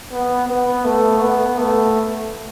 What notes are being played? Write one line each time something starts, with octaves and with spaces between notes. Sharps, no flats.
B3
B3
A3
B3
A3